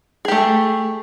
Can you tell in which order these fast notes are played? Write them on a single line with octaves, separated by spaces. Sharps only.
G#4 G4 A3